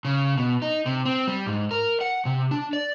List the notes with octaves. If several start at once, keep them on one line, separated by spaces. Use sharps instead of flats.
C#3
B2
D#4
C3
C4
G3
G#2
A#4
F#5
C3
D4
D5